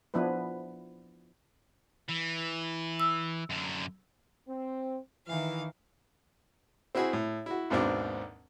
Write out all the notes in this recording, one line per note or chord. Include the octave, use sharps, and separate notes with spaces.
F3 B3 D4 E4 B4
E3
E6
F#2 D3
C4
D#3 E3 F5
C4 E4 F#4 G#4
A2
E4 F#4
G#1 D#2 G#2 B2 C4 D4